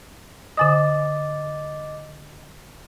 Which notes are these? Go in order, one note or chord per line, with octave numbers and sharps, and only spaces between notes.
D3 D#5 G#5 D6 D#6 A6